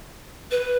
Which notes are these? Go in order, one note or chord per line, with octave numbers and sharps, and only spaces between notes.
B4